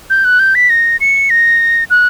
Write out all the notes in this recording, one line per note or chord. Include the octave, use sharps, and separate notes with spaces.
G6
F#6
G6
B6
A#6
C#7
A#6
F#6